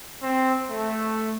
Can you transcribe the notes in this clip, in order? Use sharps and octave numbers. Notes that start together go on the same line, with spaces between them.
C4
A3